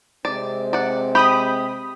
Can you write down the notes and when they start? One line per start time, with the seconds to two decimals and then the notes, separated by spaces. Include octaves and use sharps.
0.25 C3 G#3 C4 D5
0.73 D5 F#5
1.15 G4 B5 D#6